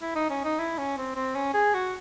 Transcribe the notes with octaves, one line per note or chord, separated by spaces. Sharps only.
E4
D#4
C#4
D#4
E4
C#4
C4
C4
C#4
G#4
F#4